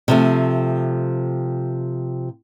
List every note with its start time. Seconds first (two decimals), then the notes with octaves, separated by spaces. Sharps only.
0.08 C3 F3 A3